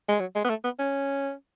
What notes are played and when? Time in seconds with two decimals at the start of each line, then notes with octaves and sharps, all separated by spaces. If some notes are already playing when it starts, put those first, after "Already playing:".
0.09 G#3
0.20 F#3
0.35 G#3
0.45 B3
0.49 A3
0.64 B3
0.79 C#4